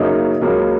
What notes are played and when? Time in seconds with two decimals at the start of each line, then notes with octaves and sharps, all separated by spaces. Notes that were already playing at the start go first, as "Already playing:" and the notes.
Already playing: F#2 C#3 F#3 A#3 D#4
0.41 C#2 C#3 F#3 A#3